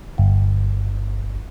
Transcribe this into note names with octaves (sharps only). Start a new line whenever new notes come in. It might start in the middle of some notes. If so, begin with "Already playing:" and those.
G1